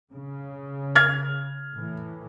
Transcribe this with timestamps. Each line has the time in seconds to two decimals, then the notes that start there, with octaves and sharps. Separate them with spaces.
0.11 C#3
0.95 F6 G#6
1.72 A2 E3